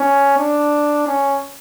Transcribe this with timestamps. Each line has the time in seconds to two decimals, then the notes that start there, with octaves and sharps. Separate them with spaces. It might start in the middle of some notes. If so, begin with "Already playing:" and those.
Already playing: C#4
0.38 D4
1.07 C#4